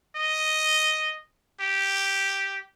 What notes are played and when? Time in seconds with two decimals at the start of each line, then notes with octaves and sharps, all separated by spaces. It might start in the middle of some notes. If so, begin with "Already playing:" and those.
0.16 D#5
1.61 G4